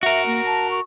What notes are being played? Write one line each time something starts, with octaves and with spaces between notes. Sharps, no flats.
F#4 A#4 E5
A#3
A5
C#6